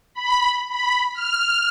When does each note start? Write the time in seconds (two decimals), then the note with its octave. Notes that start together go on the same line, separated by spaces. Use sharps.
0.14 B5
0.69 B5
1.14 F6